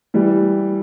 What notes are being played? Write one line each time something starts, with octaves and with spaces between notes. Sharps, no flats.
E3 G3